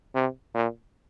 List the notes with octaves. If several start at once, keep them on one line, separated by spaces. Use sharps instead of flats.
C3
A#2